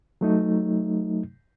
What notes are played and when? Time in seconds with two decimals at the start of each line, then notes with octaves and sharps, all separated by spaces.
0.21 F#3 A3 D#4